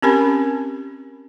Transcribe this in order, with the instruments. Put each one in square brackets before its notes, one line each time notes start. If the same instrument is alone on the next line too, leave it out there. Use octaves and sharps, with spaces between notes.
[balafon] C4 C#4 G4 A#4 G#5 B5